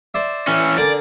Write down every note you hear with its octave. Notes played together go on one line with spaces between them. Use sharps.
C5 D5 E5
E3 C#4
D3 A#4 D5 G#5